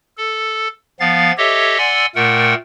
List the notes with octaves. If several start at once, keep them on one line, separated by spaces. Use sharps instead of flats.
A4
F3 B3 F5 A6
G4 A4 C#5 D#5 E5
D5 F#5 G#5 C6 E6
A#2 A3 A#4 F#5 G5